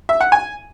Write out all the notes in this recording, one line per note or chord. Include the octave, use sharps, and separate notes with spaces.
E5
F#5
G#5